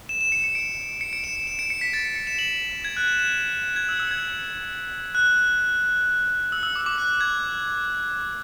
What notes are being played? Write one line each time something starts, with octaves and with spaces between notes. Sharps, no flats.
E7
E7
C#7
C#7
D7
C#7
D7
E7
E7
E7
D7
C#7
B6
A6
C#7
C#7
E7
F#7
G#6
F#6
E7
E7
G#6
E6
E6
G#6
F#6
E6
E6
D6
E6
D6
F#6
G#6